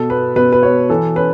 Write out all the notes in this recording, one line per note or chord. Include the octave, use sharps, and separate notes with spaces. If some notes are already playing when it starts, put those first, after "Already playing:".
Already playing: B2 A4
B3 B4
B2 B4
B4
B3 C#5
E3 A4
C#4 B4